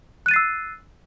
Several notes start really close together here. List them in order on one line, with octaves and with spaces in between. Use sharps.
F#6 D#7 A6 C7 E6